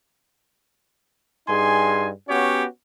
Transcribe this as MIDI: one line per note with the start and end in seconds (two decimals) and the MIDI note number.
1.48 2.09 43
1.48 2.09 63
1.48 2.09 68
1.48 2.09 80
1.48 2.09 84
2.28 2.65 59
2.28 2.65 61
2.28 2.65 66
2.28 2.65 67
2.28 2.65 73